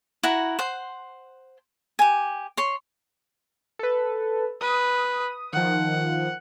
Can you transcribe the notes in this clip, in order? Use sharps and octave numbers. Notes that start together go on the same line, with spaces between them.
E4 F#4 F#5 A#5
C5 F#5 C6
G4 G#5
C#5 C6
A4 B4
B4 D#6
D#3 F3 F#5